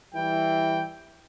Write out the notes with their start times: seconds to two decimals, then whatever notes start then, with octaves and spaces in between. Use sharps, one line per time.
0.14 E3 G3 E4 G5